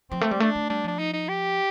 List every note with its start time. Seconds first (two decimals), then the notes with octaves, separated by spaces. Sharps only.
0.11 F3 C4
0.21 A3
0.31 G3
0.40 A3 D4
0.55 A3
0.70 G3 D4
0.84 F3 D4
0.99 D#4
1.13 D#4
1.29 G4